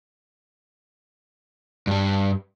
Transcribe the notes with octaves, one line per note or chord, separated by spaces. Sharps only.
G2 G3